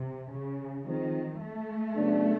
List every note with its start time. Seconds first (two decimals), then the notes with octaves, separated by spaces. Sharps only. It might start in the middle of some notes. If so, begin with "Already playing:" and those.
Already playing: C3
0.31 C#3
0.85 D#3 F3 G#3 C4 D#4
1.41 A3
1.96 C#3 F#3 B3 D4